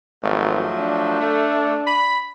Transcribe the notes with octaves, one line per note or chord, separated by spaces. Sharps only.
G#1 F3 F#3 A3
D4
A3
B5